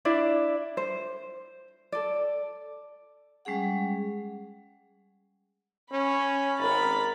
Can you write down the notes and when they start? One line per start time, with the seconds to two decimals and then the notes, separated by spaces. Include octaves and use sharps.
0.05 D4 E4 D5
0.77 C5
1.92 A4 D5
3.45 G3 G#3 C#4 G#4 F#5
5.92 C#4 B5
6.59 G#1 A#4 B5 A6